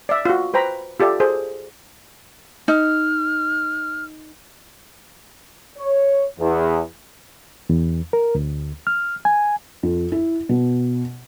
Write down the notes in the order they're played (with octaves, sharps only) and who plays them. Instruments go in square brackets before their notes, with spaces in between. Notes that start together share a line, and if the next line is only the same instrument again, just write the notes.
[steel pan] D5 E5
F4 F#4
B4 C5 G5 A#5 B5
F4 G4 A4 D5 E5
G#4 A4 C5
[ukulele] D#4 [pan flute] F6
[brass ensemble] C#5
E2
[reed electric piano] E2
A#4
D2
F6
G#5
[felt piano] F2
E4
B2